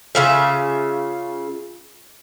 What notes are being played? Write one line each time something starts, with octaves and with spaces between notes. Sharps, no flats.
C#3 F4 E5